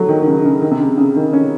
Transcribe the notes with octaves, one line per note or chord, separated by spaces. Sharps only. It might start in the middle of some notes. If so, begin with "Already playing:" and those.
Already playing: F#3 A3
D#3
D#3
C#3
C#3
D#3
C3
C#3
C#3
D#3
C#4